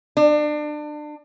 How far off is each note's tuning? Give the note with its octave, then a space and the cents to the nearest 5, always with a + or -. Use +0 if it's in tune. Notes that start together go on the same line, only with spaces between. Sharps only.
D4 +30